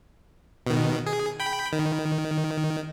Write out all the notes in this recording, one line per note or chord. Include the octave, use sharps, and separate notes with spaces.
B2 D#3
G#4
G5 B5
D#3